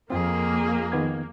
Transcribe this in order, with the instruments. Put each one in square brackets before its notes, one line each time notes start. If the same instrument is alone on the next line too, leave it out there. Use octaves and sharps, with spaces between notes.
[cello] F2 G#4 [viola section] A#3 [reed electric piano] C4 F4
[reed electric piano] D#3 B3 G#6